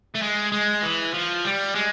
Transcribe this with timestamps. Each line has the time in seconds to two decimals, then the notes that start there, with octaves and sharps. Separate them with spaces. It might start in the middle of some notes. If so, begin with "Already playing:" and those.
0.15 A3
0.22 G#3
0.52 G#3
0.83 E3
1.14 F3
1.45 G3
1.75 G#3